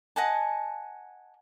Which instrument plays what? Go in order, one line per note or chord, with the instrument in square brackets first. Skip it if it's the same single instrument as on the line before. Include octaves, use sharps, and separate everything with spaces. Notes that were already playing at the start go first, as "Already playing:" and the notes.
[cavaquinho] D#5 F#5 G#5 A5